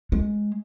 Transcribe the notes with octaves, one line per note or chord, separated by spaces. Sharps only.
G#3